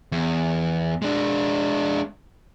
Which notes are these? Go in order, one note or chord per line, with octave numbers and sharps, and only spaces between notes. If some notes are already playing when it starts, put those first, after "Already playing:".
E2
G#3 D4